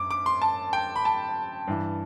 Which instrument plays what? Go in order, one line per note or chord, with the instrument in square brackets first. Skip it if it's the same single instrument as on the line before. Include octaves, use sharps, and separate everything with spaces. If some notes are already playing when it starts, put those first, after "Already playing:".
Already playing: [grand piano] F#2 D6
D6
C6
A5
G5
B5
A5
G2 E3